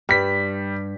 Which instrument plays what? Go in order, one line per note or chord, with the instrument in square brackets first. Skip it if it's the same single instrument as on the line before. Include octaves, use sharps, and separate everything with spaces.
[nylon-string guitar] G2 [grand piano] G3 B6